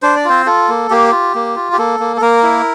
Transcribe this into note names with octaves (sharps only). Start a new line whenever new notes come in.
D4 C5
D5
C4 F4 C5
F4 A4
A#3
A#3 G4
F4
A#3
F4
G4
A#3 A4
A#3
A4
A#3 A#4
E4